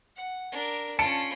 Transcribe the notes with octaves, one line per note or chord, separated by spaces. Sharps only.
F#5
D4 A#4
C#4 F4 A5 C#7 D7